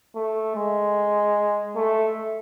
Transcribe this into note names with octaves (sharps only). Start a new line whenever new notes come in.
A3
G#3
A3